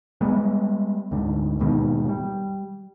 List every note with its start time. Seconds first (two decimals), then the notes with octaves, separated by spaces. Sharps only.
0.21 G3 G#3 B3
1.11 D2 G#2 D3
1.59 D#2 G#2 B2 D#3
2.09 G3